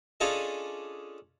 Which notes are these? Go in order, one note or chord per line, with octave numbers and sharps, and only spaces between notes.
C#4 D4 F4 G#4 A4 D#5